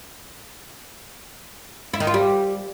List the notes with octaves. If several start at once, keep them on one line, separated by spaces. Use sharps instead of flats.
E4
D#3
F4
G3